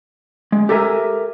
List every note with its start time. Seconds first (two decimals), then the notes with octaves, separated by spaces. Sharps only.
0.52 G#3
0.69 G4 A4 A#4 E5 G#5